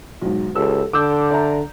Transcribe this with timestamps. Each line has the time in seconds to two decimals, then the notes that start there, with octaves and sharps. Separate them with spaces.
0.21 B1 G#2
0.55 C#2 G4 A4 E6
0.93 D3 D6 E6 G6
1.31 D5 E5 A#5